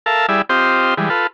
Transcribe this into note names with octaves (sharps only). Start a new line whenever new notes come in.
A4 A#4 E5 F5 A5
G3 E4 G#4 D5 E5
C4 F4 G4 C5 D#5
E3 G3 G#3
F4 A4 B4